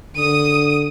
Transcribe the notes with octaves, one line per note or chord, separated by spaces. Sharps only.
D3 D#6 D#7